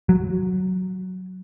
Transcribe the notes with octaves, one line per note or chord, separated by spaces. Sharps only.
F#3